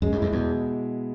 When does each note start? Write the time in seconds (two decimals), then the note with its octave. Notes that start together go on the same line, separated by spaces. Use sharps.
0.02 F#2 G#3
0.12 F#2
0.18 E2 E4
0.32 E2 B2